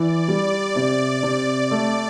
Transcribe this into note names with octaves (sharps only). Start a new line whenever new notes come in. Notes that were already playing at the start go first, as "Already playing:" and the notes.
Already playing: E3 D5
G3
C3
C3
A3 D5